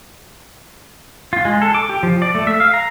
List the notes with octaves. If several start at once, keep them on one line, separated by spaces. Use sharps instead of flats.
F4
G#3
A4
D6
G4
F3
D5
A3
E5
F5
A#5